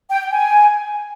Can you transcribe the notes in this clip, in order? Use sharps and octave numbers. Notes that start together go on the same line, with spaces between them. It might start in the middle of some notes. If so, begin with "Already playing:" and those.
G5
G5
G#5